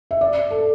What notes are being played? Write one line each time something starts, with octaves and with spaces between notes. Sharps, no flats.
E5
D5
A4